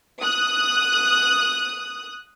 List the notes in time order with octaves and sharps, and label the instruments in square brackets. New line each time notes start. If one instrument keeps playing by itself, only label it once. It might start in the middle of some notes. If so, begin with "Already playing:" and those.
[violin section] D#6 F#6